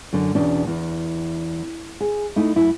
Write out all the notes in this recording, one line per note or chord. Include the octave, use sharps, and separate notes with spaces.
F#2 D3
E2 B2 C#4 D4
E2
G#4
A3 D#4 E4
F#2 E4